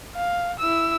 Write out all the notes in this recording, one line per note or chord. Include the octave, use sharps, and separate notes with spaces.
F5
E4 E6